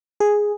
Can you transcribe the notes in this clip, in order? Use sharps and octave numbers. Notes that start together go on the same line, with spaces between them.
G#4